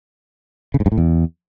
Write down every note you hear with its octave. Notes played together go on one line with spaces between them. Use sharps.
C#3
G#2
G2
A2
E2